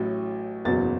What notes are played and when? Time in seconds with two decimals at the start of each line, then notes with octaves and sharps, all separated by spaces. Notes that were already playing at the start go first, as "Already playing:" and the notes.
Already playing: A1 A2 F#3
0.65 F#1 E2 B2 F#3 A6